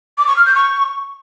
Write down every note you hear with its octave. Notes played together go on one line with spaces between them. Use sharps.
D6
C#6
F6
G6
C#6